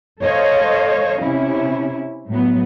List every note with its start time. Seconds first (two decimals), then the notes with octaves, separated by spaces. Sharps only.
0.22 A4 C5 C#5 D#5 F5
1.22 C3 C#4 E4
2.28 A2 F#3 B3